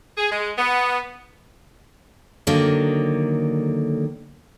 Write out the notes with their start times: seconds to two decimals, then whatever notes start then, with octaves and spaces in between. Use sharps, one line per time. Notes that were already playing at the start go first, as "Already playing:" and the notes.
0.17 G#4
0.30 G#3
0.58 B3
2.47 D3 D#3 F#3 A#3